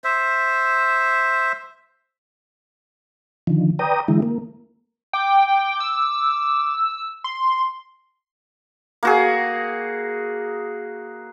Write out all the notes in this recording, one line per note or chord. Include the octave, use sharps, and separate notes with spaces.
C5 E5
D3 D#3 F3
B4 D5 G5 A#5 D#6
D3 E3 G#3 E4
A#3
G5 D6
E6
C6
A#3 F#4 G#4